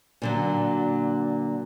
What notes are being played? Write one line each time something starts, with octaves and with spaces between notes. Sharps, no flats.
A#2 D3 F#3